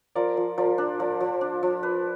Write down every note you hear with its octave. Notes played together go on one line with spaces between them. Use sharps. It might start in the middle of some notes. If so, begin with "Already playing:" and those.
F3 A#4 D5
F3
F3 A#4 D5
D4
F3 A#4 D5
F3
D4
F3
B4